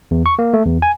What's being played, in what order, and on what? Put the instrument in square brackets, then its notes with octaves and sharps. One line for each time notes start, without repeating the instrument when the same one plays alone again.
[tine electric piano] E2
C#6
A#3
A3
E2
G#5